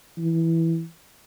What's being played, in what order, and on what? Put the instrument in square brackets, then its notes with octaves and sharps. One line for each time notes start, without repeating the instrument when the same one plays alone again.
[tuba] E3